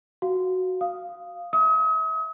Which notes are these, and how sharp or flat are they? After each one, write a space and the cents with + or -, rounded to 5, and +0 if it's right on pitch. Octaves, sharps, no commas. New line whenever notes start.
F#4 +0 F5 +0
F5 +0 D#6 +0
E5 -25 D#6 +40